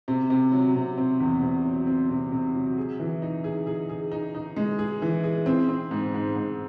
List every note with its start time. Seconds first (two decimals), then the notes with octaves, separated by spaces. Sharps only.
0.08 C3
0.30 C3
0.52 F#3
0.75 C3
0.98 C4
1.20 E2
1.42 C3
1.64 F#3
1.87 C4
2.10 C3
2.32 C3
2.55 F#3
2.77 G#4
2.99 E3
3.22 D#4
3.44 G#4
3.67 G#4
3.89 G#4
4.12 D#4
4.35 D#4
4.56 G#3
4.79 G#4
5.02 E3
5.24 G#4
5.46 C4
5.69 C4
5.91 G#2
6.14 G#2
6.36 G#2